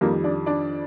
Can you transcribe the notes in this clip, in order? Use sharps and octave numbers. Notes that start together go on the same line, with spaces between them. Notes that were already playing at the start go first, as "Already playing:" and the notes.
F2 D#3 G3 A#3 A#4
D4 D5
D4 D5